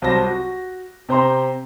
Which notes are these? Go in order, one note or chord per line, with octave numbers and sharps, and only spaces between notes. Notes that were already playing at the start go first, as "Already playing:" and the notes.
C2 F#3 C5 A5 A#6
F#4
C3 C5 A#5 C6